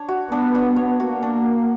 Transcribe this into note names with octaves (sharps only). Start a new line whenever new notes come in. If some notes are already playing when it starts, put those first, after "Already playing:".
Already playing: D4 C#5
F#4
B3 D4
D4
C#5
A#3 F#4
D4